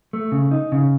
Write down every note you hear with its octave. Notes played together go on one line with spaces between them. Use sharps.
A3
C#3
D#4
C#3